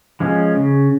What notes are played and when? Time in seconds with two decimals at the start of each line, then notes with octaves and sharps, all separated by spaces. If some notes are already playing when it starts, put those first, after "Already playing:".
0.20 F3 G#3 C#4
0.54 C#3